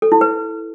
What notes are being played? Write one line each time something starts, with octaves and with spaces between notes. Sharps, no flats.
A4
E4
B4